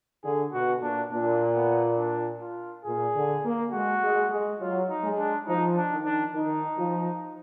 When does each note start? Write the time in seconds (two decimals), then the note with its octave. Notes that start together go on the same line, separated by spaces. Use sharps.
0.24 D3 G#4
0.53 B2 F#4
0.82 A#2 D4
1.11 A#2 D4
1.55 B3
1.98 D4
2.42 F4
2.85 A#2 G#4
3.15 D3
3.44 A#3
3.73 G#3 F#4
4.01 G#3
4.30 G#3
4.60 F#3 F4
4.89 D#4
5.03 G#3
5.18 D4
5.47 F3 D#4
5.76 D4
5.91 D#3
6.05 D4
6.34 D#3 D#4
6.77 F3